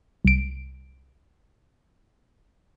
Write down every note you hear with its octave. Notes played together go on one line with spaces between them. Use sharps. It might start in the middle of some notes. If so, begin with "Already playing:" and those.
C2 D7